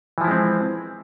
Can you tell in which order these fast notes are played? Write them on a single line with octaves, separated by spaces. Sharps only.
E3 F3 E4 G#3 C4